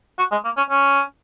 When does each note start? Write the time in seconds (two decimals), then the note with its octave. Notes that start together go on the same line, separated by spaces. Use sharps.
0.18 F#4
0.31 G#3
0.44 A#3
0.57 C#4
0.70 C#4